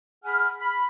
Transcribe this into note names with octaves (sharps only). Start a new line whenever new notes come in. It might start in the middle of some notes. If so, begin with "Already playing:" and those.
G#4 F#5 G#5 B5 F6
B5